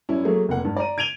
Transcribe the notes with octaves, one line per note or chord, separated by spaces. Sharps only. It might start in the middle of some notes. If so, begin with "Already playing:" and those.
F#2 G3 C#4 E4
F#3 A3 A#3 G#4
F1 A#3 F#5
G2
D5 A#5 D#7
G#6 D7 D#7 F7 G7